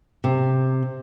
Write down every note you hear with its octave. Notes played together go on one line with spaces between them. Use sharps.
C3